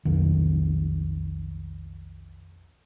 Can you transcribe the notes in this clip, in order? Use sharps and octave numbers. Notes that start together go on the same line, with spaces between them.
B1 F2 D#3